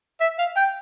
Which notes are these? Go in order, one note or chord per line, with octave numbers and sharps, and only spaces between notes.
E5
F5
G5